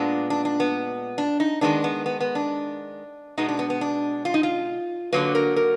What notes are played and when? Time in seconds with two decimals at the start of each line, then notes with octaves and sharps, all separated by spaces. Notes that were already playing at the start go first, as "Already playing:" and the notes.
Already playing: A#2 G#3 B3 D4
0.30 D4
0.45 D4
0.60 B3
1.18 D4
1.40 D#4
1.61 D#3 G#3 B3 D4
1.84 B3
2.06 B3
2.20 B3
2.35 D4
3.37 B2 G#3 B3 D#4
3.49 D4
3.59 B3
3.70 B3
3.81 D4
4.25 F4
4.34 D#4
4.43 F4
5.13 D3 F#3 A#3 B4
5.35 A#4
5.56 A#4